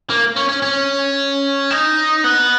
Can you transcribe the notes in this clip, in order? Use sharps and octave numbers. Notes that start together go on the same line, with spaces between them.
A#3
C#4
C#4
C#4
D#4
B3